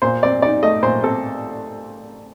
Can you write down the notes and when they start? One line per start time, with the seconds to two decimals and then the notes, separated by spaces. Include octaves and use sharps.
0.02 A#2 C5
0.23 C4 D5
0.42 D#4 D5
0.62 A3 D#5
0.83 A#2 C5
1.03 C4 A4